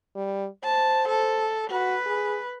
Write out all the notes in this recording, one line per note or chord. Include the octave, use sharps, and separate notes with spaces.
G3
C5 A5
A4
F#4 B4
G#4